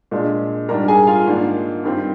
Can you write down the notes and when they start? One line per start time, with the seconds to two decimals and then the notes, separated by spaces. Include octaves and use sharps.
0.11 A#2 G#3 D4
0.69 G#2 G3 D4 A#4 A#5
0.88 G#4 G#5
1.07 F4 F5
1.26 G#2 D#3 A#3 D4
1.84 G2 D#3 G3 C4